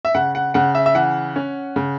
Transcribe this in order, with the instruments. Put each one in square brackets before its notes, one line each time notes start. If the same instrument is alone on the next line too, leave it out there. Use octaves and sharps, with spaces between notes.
[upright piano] E5
C#3 F#5
F#5
C#3 F#5
E5
E5
E3 F#5
C#4
C#3